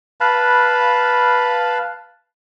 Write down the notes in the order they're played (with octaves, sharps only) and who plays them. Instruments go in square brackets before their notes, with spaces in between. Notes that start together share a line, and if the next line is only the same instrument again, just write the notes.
[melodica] B4 F5 A5 B5